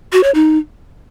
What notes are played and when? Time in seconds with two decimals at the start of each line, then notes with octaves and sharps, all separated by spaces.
0.12 F#4
0.23 C#5
0.35 D#4